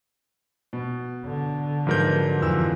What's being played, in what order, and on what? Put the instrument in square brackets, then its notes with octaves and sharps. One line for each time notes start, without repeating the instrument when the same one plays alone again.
[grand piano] B2
[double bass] D3
[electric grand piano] G#2 A#4 G6 [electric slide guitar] F3 F#3 B4
[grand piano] F2 E3 E6